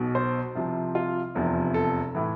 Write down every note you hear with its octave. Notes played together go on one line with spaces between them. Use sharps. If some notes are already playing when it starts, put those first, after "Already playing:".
Already playing: B1 B2
C5
C2 C3 F3
F4
F1 E2 C3 F3
A4
A2 E3